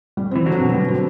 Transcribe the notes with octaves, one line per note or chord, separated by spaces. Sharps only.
G3
E3 C4
D3 F#3 F#4
B2
G3
C4